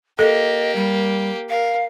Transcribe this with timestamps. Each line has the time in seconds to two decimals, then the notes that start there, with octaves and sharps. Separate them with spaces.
0.19 A#3 G4 A4 D#5
0.76 G3
1.50 A#4 F5